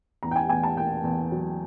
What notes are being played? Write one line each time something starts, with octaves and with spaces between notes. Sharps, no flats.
E2 A#5
G5
G#5
E2 G#5
A5
A#3 G5
E2
F#3